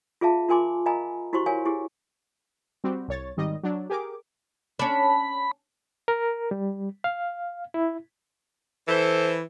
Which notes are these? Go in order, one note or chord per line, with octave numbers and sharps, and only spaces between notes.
F4 G#4 E5 F5 A5
F4 A#4 G#5 C6 D6
A#4 D#5 F5 G#5 A#5 B5
E4 F#4 G4 C5 C6 C#6
A#4 C#5 F5 G#5
E4 G4 G#4
G3 C4 F#4 G4
C2 C#5 A6
G#1 G#2 D#3 G3 D#5
F#3 D4
G4 G#4 A#4 D6
C#4 D4 B5
A#4
G3
F5
E4
E3 A4 C5